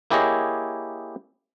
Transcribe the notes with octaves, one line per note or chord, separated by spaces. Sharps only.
A#3 E4 G4 G#4 C#5 D#5